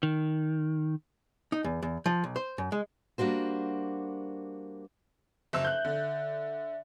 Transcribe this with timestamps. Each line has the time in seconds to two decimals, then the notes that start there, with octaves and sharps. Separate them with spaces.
0.03 D#3
1.52 D#4
1.64 E2
1.83 E2
2.06 F3
2.24 B1
2.36 C5
2.58 F#2
2.72 G#3
3.18 G3 A#3 D4 F#4 C5
5.53 F#1 E5 E6
5.65 F#6 G6
5.85 D3